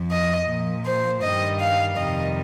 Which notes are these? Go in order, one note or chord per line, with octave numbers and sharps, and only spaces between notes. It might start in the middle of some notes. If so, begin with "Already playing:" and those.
Already playing: F2 F3
D#5
A#2 F3
C5
G2 D#3 G3 D#5
F5
F2 C3 D#3 G3 D#5